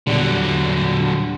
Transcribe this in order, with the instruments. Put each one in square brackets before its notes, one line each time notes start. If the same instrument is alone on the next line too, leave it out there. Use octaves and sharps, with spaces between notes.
[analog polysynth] E2 A#2 G3 [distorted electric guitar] D3 F#3